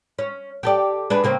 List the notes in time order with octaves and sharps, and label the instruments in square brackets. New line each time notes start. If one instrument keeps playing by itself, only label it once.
[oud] C#4
G4 A4 D5
D4 G#4 B4
C#3 A#3 C4